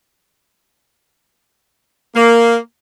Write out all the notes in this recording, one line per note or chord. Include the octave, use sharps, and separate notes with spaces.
A#3